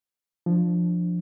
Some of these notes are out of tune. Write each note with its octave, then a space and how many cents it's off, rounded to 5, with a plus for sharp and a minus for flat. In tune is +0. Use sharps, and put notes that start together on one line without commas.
F3 +0 D4 +10